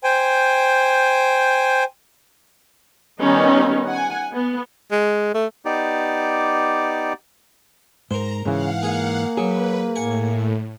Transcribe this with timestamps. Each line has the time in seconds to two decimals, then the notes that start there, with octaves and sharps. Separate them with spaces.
0.04 C5 G5 G#5
3.19 D#3 G3 B3 C#4 D#4
3.86 F#5 G#5
4.34 B3
4.91 G#3
5.34 A3
5.65 B3 D#4 G4 D5
8.11 G#2 A#4 C5 A#5
8.45 G#2 C#3 E3 F5 F#5
8.83 A#3 G#4
9.37 F#3 G#4 B4
9.96 A2 F#5 G#5